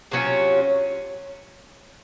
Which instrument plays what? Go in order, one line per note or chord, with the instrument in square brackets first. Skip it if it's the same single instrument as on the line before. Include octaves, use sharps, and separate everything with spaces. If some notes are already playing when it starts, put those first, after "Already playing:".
[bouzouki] C3 F#3 C#4 F4